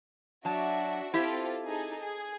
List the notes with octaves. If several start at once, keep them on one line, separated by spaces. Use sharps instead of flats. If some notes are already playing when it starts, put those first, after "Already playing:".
F#3 D4 F#4 E5 A5
C4 E4 F4 G4 A4 E5
D#4 G#4 A4
G#4